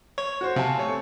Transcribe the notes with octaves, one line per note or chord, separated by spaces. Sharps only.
C#5
F#4 C5
C3 F5 G#5 A5
A3 C#5